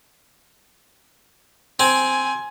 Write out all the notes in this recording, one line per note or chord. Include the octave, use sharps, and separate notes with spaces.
C4 G#5